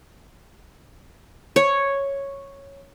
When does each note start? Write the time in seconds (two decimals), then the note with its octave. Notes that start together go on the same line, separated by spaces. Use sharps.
1.56 C#5